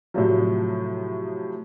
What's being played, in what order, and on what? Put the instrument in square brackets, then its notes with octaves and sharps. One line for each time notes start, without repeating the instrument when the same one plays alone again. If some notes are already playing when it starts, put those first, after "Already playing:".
[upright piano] A2 C3 F3 F#3